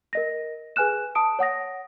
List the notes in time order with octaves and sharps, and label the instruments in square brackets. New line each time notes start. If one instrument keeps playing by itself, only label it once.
[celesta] A#4 D#5 A#6
G#4 B4 G#5 F6 F#6 E7
A5 D#6 D7
C#5 F#5 D#6 A#6